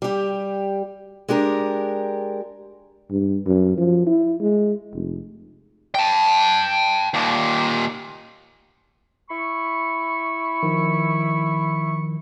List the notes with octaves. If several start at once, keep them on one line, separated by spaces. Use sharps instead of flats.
G3 G4
G#3 D4 G4 A#4
G2
F#2
F3
E4
G#3
F1
G5 A5
D#2 A#2
E4 B5 C#6
D#3 F3